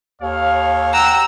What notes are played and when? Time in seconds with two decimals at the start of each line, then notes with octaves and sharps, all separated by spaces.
0.22 D#2 A4 C#5 F5
0.93 F#5 G5 A#5 E6